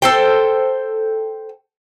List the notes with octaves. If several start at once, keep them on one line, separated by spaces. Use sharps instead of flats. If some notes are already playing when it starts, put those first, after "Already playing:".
A4 C5 G5